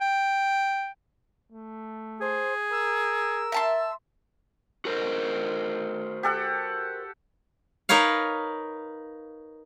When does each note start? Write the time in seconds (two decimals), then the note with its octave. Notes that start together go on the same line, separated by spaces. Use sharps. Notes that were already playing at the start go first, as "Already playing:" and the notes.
0.01 G5
1.52 A3
2.21 G#4 C5
2.72 A#4 E6
3.52 E5 A5 C6
4.85 F#4 A#4 C5
6.23 G4 A4 F#5
7.89 D#4 A#4 B4 C#5 F5